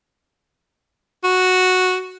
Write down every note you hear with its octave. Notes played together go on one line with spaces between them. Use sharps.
F#4